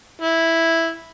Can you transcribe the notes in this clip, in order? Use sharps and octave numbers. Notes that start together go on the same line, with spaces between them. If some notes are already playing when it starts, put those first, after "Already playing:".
E4